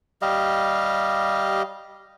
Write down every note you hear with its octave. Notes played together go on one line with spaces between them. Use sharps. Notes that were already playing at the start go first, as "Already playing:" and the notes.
G3 G4 D#5 F5